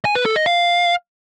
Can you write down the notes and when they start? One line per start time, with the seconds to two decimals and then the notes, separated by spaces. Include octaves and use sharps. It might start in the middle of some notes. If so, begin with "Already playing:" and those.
0.05 G#5
0.15 B4
0.26 A4
0.36 D#5
0.46 F5